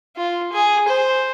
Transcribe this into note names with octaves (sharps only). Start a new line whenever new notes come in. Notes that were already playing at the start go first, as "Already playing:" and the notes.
F4
G#4
C5